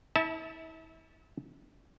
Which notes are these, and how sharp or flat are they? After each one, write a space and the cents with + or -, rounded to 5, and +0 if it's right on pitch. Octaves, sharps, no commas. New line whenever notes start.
E4 -40 E5 -20 A5 +0